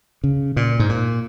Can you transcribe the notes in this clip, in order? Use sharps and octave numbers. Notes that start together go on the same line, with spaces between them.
C#3
A#2
G#2
A#2